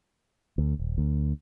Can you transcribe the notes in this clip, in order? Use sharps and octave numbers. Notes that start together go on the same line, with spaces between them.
D2
D#1
D2